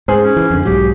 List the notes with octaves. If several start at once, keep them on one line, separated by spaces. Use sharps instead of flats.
G#2 G#4 C5
C#4
E3
F2 D3
B1 G#2 F#3 G4